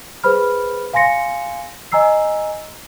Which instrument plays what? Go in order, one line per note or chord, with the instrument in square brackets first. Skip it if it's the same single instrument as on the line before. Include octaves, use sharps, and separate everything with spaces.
[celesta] G#4 B4 C5 B5 F6
F5 G#5 C6 A#6 C#7
D#5 G#5 A#5 E6 C7